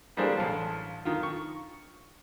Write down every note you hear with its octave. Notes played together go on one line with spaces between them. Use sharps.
E3 G3 A#3 D4 G#4 C5
A1 F5 A5
D#3 F4
C#6